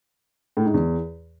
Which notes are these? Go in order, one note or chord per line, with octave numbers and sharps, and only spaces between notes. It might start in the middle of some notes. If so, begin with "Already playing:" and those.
A2
G#2
E2